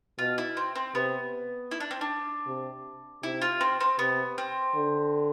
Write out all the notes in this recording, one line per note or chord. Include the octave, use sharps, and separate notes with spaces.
B2 F4
E4
C4
C4
C3 B3
E4
D4
C4
D4
C3
C3 E4
F4
C4
C4
C3 B3
C4
D3